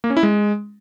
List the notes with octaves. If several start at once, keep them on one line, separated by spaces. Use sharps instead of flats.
A#3
C#4
E4
G#3